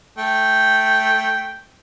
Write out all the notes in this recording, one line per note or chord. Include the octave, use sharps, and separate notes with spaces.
A3 G5